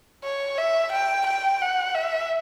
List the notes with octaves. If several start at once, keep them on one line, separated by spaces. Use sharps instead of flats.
C#5
E5
G5
G5
F#5
E5